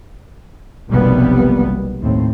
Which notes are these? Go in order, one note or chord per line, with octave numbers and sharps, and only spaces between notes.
F1 B1 C3 G3 A#3 B3
D#2 A2 C4